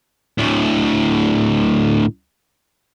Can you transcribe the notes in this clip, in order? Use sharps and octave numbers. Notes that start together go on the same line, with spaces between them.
D2 A2